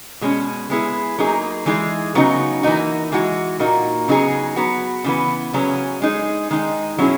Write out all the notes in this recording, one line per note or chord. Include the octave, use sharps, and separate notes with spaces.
B2 G#3 C#4
G#3 B3 E4 G#4
F#3 A#3 D#4 G#4
E3 G#3 D#4 G#4
C#3 F#3 B3 D#4 F#4
E3 A#3 D#4 F#4
E3 G#3 D#4 F#4
A#2 A#3 D#4 F#4
C#3 F#3 B3 D#4 G#4
F#3 B3 F#4
C#3 E3 B3
C#3 F#3 C#4 G#4
G#3 D#4 G#4
D#3 G#3 D#4
B2 F#3 C#4 E4 G#4